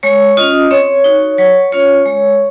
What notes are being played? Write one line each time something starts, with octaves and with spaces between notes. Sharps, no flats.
G#3 C#5 C#6
C#4 F4 D#5 D#6
C4 C#5 C#6
D#4 F#4
F#3 C#5 C#6
C#4 F4 C#5 C#6
G#3